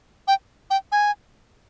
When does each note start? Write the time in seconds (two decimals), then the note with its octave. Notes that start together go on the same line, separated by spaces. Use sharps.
0.28 G5
0.70 G5
0.92 G#5